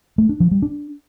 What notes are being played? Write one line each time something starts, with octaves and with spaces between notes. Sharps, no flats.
A3
D4
F3
G3
D4